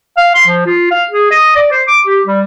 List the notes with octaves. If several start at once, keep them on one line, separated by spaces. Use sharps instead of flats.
F5
C6
F3
F4
F5
G#4
D#5
D5
C5
D6
G4
G3